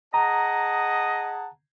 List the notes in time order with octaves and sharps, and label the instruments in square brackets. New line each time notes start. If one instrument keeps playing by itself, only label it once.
[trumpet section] G#4 F#5 A5 [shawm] D#5 [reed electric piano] A#5